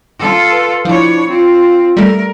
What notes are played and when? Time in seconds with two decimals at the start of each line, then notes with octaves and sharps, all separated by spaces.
0.19 F4 A4
0.52 B4
0.85 F3 D4 E4 C#5
1.29 C4 F4
1.97 G3 A3 A#4